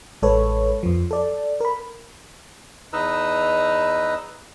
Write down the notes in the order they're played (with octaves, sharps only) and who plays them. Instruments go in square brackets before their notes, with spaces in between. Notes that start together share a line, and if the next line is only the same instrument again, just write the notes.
[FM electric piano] A1 G#3 A4 B4 C#5
F2 F3
A4 D5
A#4 B5
[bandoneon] E2 D#4 B4 D#5 A#5 E6